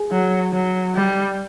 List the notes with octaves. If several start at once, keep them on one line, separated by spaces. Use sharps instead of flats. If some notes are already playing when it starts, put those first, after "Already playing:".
Already playing: G#4
F#3
F#3
G3